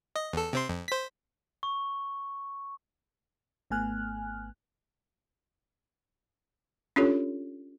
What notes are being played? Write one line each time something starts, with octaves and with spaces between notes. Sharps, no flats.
D#5
E2 A4
C3 C4 C6
F2
C5 B6
C#6
G#1 A3 B3 G#5 F6 F#6
C#4 D4 F4 G4 A4 C#5